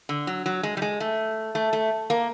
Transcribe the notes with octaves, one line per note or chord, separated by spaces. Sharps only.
D3
F#3
F#3
G#3
G3
G#3
A3
A3
A3
A#3